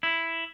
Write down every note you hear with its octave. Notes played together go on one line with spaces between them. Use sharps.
E4